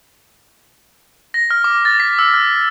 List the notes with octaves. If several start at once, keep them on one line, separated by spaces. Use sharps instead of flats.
A#6
F6
D6
A6
B6
E6
F6